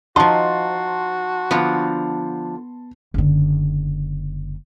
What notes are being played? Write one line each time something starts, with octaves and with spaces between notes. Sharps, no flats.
F3 D#4 F#4 A5 C6
D3 F3 B3
F#1 D3